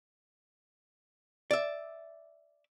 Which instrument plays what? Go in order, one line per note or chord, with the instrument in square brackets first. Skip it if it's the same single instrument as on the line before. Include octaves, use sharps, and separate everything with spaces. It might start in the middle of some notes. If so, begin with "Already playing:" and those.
[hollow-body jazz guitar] D5 E5